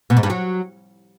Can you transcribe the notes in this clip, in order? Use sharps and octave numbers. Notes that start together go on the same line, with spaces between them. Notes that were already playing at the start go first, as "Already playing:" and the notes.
B2
G#2
G2
F#3